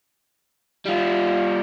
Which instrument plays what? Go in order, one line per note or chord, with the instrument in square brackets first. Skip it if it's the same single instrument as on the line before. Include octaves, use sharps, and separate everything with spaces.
[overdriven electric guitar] G3 F4